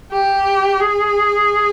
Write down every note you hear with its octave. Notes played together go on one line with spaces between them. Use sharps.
G4
G#4